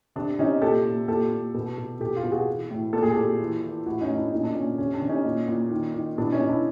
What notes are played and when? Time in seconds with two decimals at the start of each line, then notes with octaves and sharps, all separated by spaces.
0.16 C3 D4
0.39 C3 C#4 D#4
0.61 A#2 G4 A4
0.85 A#2
1.08 A#2 G4 A4
1.31 A#2
1.54 B2
1.78 B2
2.00 B2 G4 A4
2.16 F4 G4
2.24 B2
2.31 F#4 G#4
2.47 E3
2.71 A2
2.93 A#2 A4
3.03 G#4
3.12 G4 A4
3.17 A#2
3.40 E3
3.63 E3
3.86 A2 E4 F#4
4.01 C#4 D#4
4.10 A2
4.17 D4 E4
4.32 A#2 C#4 D#4
4.43 D4
4.55 A#2 C#4
4.78 C3 C#4
4.94 D4
5.01 C3
5.09 C#4 D#4
5.25 A#2
5.48 A#2
5.71 D#3
5.94 D#3
6.18 B2 D4 E4
6.32 C#4 D#4
6.40 B2
6.49 D4 E4